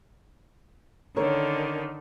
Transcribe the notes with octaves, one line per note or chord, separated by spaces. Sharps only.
D3 D#3 C#4 A4 A#4 C#5